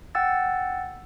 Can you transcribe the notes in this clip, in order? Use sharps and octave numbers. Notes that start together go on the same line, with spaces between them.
F#5 G5 E6 A6